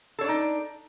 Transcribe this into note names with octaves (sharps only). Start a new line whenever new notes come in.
D4 D#4 A4 C#5 D5